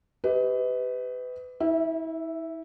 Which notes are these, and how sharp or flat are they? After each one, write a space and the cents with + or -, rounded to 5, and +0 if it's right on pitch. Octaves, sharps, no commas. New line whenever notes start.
G4 +0 B4 +25 D#5 +30
E4 -35 E5 +0